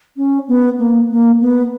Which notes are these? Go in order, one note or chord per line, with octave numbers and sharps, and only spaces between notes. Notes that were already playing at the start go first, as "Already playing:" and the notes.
C#4
B3
A#3
A#3
B3